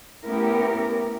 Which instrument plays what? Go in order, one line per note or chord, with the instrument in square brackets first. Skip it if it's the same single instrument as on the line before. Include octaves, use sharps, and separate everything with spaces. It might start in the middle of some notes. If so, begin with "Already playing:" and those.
[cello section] A3 B3 C#4 E4 G4 A#4